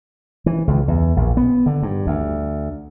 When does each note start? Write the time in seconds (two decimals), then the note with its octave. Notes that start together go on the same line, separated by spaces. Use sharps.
0.46 E3
0.67 C#2
0.88 E2
1.16 A#1
1.37 B3
1.66 D3
1.83 G2
2.07 D2